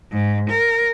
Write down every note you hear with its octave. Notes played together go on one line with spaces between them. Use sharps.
G#2
A#4